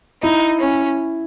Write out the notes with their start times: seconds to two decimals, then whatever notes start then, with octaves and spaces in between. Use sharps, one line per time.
0.23 D#4 E4
0.61 C#4